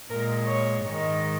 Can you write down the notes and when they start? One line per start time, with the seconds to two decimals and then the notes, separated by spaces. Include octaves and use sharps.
0.10 A#2 G#3 A#4
0.46 C#5
0.83 G#2 D#3 G#3